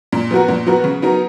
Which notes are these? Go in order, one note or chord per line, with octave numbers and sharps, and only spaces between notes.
A#2
F3 B3 F#4 A#4
A#2
F3 B3 F#4 A#4
C#3
F#3 B3 D#4 A#4